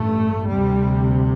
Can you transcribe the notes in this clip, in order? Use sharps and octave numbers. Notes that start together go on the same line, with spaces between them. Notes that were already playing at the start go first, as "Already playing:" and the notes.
Already playing: A1 G2 A3
D2 C3 G3